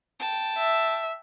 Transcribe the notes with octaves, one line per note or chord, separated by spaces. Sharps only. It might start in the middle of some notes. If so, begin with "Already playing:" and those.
G5 A5
E5